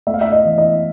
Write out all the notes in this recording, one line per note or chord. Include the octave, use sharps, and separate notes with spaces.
A3 E5
F5
E5
D#5
E3
D#5